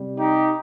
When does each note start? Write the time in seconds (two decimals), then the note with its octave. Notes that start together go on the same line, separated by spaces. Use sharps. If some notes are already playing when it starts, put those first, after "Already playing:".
Already playing: C3 G3
0.18 D#4 G4